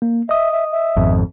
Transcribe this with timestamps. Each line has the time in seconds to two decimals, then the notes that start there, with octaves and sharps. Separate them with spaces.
0.02 A#3
0.29 D#5 E5 D#6
0.52 E5
0.71 E5
0.96 G#1 F2